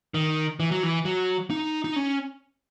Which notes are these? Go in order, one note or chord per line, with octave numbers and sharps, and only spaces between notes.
D#3
E3
F#3
E3
F#3
D#4
D#4
C#4